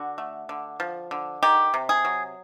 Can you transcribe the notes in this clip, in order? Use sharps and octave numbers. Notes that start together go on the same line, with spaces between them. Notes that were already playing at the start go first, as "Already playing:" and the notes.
Already playing: D3 F#4
A3
D3
F3
D3
D#3 G4
C3
G#4
F#3